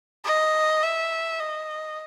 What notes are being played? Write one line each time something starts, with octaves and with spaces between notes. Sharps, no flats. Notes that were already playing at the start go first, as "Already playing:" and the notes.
D#5
E5
D#5